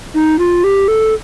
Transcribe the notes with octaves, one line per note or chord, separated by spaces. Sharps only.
D#4
F4
G4
A4